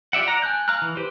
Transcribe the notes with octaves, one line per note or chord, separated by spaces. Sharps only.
F4 G4 D5 E5 F#5
D5 F#5 A#5
G#5 A5 F#6 G6
F5 G#5 A#5 F6 F#6
E3
G4 B4 C5